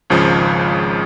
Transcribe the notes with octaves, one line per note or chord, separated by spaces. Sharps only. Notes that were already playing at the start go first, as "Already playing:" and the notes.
G#1 C#2 C#3 F3